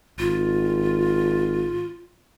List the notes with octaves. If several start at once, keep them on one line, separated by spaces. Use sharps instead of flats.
G#1 F4